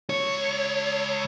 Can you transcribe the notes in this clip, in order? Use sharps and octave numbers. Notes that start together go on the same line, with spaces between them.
C#2 C#5